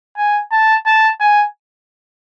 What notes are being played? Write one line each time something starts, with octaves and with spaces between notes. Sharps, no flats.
G#5
A5
A5
G#5